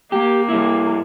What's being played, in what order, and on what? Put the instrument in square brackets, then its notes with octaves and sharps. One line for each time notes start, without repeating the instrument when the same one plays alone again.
[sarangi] A#3 [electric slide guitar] G4
[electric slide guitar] G2 E4